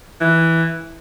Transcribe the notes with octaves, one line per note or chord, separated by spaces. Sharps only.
E3